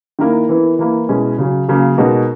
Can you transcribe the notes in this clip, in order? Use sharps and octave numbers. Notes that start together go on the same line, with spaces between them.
D#3 A#3 E4 A#4
E3 B3 E4 A#4
E3 A#3 E4 A#4
B2 G#3 C#4 E4
C#3 F#3 C#4
C#3 F#3 A#3 C#4
B2 G#3 D#4 F#4 A#4